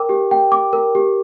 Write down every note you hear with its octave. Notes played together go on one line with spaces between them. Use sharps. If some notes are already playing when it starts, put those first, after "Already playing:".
Already playing: A#4 G5 D6
G4
G5
D6
A#4
G4